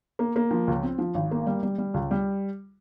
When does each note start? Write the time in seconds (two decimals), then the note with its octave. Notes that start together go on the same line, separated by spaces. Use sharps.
0.19 A#3
0.36 A#3
0.51 F3
0.67 C#2
0.83 C4
0.99 F3
1.15 G#1
1.31 A#3
1.47 G3
1.63 G3
1.78 G3
1.94 C#2
2.11 G3